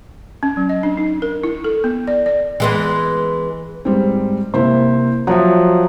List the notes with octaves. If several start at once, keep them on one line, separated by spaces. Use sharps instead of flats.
C#4
F#3
D#5
D4
D#4
A#4
E4
A4
B3
D5
D5
E3 G#3 B3
G#2 G3 C4
C3 A#3 E4 C5
F3 F#3 E5 F#5